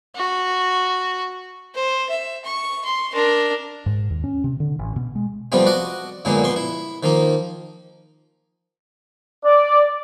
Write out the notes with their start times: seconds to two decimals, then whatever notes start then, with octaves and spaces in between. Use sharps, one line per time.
0.16 F#4
1.75 C5
2.09 E5
2.45 C#6
2.85 C6
3.13 D4 A#4
3.86 G#2
4.10 D#2
4.24 C#4
4.44 C3
4.60 D3
4.79 A1
4.96 B2
5.15 G#3
5.52 C3 F3 G3 A3 B3 C4
5.66 F#4 D5 D#5 F#5
6.25 F#2 A#2 D3 G#3 A#3 B3
6.44 A#1 B2 B3 C6 C#6
6.56 E4
7.03 D#3 F3 A#3 D#4
9.46 D5